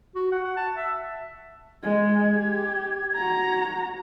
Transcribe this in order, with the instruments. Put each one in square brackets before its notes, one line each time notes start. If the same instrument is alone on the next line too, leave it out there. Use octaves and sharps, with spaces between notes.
[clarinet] F#4
F#5
F#5
A5
E5
[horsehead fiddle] G#3 [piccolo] G#6
[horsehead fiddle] G4
F#4 A#5